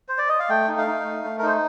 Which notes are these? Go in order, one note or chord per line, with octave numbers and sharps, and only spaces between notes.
C5
D5
D#5
F5
A3 G5
D#4
F5
D#4
A3
A3
A#4
D#4 C5